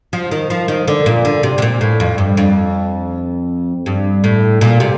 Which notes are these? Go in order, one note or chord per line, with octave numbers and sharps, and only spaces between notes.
F3
D#3
F3
D#3
D3
A#2
D3
C3
C3
A#2
A2
F2
G2
F2
G2
A2
A#2
C3